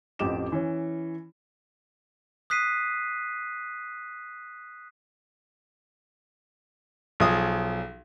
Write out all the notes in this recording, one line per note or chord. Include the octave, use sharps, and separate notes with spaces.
A1 F2 G4 D#5 D6 E7
E3 C#4
D#6 F#6 B6 C7 D#7
B1 F3 G#4 D#6